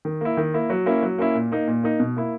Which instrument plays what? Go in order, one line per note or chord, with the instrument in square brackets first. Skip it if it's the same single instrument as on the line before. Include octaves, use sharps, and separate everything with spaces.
[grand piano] D#3
A#3 E4
D#3
A#3 E4
F#3
A#3 C#4 E4
F#3
A#3 C#4 E4
A#2
A#3 D#4
A#2
A#3 D#4
B2
A#3 E4